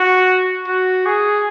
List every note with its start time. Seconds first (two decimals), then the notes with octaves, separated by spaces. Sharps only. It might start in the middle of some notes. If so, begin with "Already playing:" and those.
Already playing: F#4
0.68 F#4
1.06 G#4